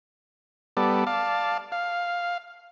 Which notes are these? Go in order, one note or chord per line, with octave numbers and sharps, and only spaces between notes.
G3 B3 A4 D5
D5 F5 A5
F5